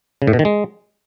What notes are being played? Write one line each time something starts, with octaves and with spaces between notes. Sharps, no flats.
C#3
A2
B2
D#3
G#3